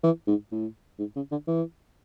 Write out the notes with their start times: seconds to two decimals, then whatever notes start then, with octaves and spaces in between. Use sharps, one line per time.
0.03 E3
0.27 G#2
0.52 A2
0.99 G#2
1.16 C#3
1.32 D3
1.48 E3